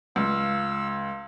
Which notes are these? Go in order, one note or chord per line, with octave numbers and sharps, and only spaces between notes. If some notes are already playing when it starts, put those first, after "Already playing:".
C#2 F5 E6